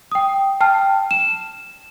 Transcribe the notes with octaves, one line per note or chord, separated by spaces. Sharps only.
G5 D#6
G5 A5 F6
E7